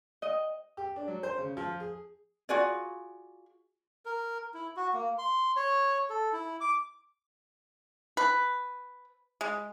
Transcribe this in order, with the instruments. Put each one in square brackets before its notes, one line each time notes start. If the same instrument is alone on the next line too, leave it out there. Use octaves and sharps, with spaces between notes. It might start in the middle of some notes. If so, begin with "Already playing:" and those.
[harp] D#5
[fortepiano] G4
D4
F#3
C5
C#3
F3
G#4
[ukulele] F4 F#4 G#4 D5
[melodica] A#4
E4
F#4
A#3
C6
C#5
A4
E4
D6
[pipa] B4
G#3